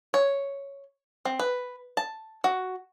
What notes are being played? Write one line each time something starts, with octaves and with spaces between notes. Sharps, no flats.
C#5
C4
B4
A5
F#4